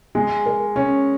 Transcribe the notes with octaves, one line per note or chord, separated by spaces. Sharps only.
G#3
A#4
C#4